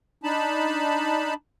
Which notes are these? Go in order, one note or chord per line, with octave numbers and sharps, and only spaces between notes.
D4 D#4 A5 B5